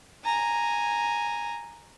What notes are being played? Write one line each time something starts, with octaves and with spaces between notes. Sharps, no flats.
G#5 A#5